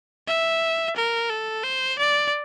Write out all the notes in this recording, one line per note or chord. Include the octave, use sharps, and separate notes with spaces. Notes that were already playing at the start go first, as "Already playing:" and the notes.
E5
A#4
A4
C5
D5